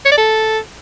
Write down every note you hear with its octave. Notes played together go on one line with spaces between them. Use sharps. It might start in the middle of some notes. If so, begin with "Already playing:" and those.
C#5
D5
A4